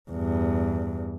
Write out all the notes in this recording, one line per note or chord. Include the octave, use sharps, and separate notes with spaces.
E2 G2